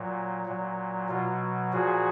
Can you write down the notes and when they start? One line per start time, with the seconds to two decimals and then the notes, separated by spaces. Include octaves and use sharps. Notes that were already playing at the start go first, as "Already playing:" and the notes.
Already playing: A#2 F#3
0.46 A#2 F#3
1.09 B2 F#3 F4
1.73 A#2 F3 F#4 G#4